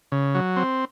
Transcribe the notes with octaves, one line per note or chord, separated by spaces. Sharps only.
C#3
F#3
C4